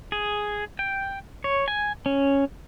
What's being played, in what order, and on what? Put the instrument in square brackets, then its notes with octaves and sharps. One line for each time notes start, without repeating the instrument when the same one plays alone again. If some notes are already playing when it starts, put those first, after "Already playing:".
[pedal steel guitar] G#4
G5
C#5
G#5
C#4